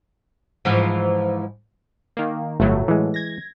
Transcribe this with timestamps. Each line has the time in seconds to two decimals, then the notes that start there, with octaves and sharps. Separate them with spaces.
0.65 G#2 E3 F3
2.17 D#3 A#3
2.60 G1 A2 F#3 A3
2.88 E3 G#3
3.14 G#6 A#6